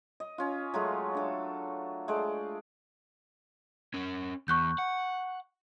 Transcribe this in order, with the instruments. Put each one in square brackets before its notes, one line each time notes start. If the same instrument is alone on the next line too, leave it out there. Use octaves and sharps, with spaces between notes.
[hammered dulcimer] D#5
C#4 F4
F#3 G#3 A3 F4
D4 A4
G#3 A3 D5
[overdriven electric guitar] C#4 A#4
[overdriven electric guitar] E2 [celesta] C#6 F#6 G6
[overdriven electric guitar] F#5